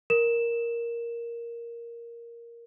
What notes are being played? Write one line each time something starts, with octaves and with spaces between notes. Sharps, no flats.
A#4 E7